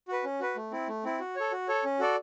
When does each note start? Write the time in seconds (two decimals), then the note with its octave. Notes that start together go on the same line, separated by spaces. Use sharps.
0.08 F#4 B4
0.24 C#4
0.40 F#4 B4
0.56 A3
0.72 C4 E4
0.88 A3
1.04 C4 E4
1.20 F#4
1.36 A4 C#5
1.52 F#4
1.68 A4 C#5
1.84 C#4
2.00 F#4 A4 D5